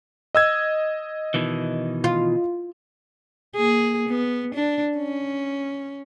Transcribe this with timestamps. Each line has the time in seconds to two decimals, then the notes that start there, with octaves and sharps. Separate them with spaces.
0.35 D#5 E6 G#6
1.34 B2 D#3 E3
2.04 F4
3.56 A#3 G#4
4.08 B3
4.55 D4
4.97 C#4